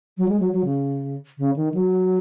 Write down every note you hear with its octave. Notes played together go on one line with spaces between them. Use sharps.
F#3
G#3
F#3
F#3
C#3
C#3
D#3
F#3